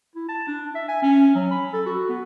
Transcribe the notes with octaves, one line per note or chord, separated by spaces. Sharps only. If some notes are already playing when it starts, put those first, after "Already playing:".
E4
A5
D4
E5
G#5
C#4
F#3
B5
A4
F#4
B3